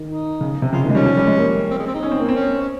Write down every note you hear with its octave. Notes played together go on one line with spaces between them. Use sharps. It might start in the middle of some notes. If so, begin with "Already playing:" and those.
Already playing: D#3
D#4
C#3
C3
C#3 F4
D#3
G#3
G3 C#4
F3
G3
G#3
A#3
C4
G#3
C4
D#4
C#4
C4
A#3
C4
C#4
C#4